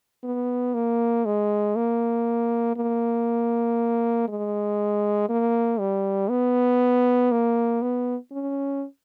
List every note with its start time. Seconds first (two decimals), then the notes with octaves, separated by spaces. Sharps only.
0.24 B3
0.75 A#3
1.26 G#3
1.76 A#3
2.77 A#3
4.28 G#3
5.30 A#3
5.80 G3
6.30 B3
7.32 A#3
7.82 B3
8.32 C#4